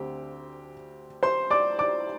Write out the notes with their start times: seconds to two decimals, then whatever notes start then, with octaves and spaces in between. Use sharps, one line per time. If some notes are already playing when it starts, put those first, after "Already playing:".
Already playing: D2 D3 C4 G4
1.23 C5 C6
1.50 D5 D6
1.79 D5 D6